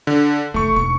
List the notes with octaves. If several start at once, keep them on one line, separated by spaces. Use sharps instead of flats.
D3
F1 E3 A3 C#6
E1 D#4 C#6